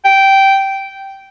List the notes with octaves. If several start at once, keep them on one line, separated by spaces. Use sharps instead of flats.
G5